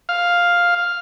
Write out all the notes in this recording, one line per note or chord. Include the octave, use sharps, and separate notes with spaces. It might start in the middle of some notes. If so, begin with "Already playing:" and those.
F5